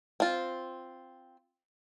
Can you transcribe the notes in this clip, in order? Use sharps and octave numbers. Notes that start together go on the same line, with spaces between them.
C4 F4